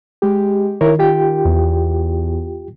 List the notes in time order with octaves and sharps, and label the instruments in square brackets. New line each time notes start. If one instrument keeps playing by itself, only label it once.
[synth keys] G#3 G4
[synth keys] D#3 [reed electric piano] E4 A#4 C#5
[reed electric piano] F4 G4 G5
[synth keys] E2